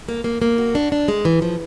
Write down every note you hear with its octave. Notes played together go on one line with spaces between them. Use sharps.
A#3
A#3
A#3
F#4
D4
D4
G#3
E3
F3